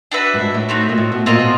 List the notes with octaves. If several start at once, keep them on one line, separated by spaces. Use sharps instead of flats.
D4 F#4 B4 E5
G2
G#2
A2
A3 C4 D#4 F#4
A#2
A2
B2
A#2 C4 F4 A#4 D#5
B2